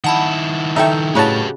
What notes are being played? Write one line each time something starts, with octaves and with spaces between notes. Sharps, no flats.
D#3 E4 F#5 A5 B5
D#4 A4 C#5 E5 G5
A2 C#3 F#4 G4 B4 C#5 D#5 A5